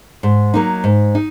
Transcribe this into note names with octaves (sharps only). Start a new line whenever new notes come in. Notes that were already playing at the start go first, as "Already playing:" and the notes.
G#2
F#3 A#3 D#4
G#2
D#4